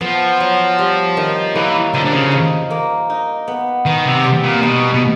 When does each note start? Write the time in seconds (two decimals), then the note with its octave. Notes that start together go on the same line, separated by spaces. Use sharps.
0.01 F3 B3
0.40 F#3
0.78 G3
1.17 D#3
1.55 E3 A#3
1.94 D3 F3
2.05 D3
2.13 C#3
2.32 D#4
2.70 A#3
3.10 D#4
3.48 B3
3.86 D#3 B3
4.05 C3
4.24 G3
4.43 A#2
4.62 B2 D#4
4.93 B2